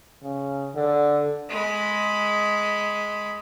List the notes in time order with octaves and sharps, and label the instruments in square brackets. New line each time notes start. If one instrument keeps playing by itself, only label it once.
[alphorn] C#3
D3
[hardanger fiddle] G#3 B5